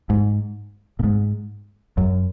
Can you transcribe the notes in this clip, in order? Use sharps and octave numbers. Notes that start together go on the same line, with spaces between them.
G#2
A#2
G#2
F#2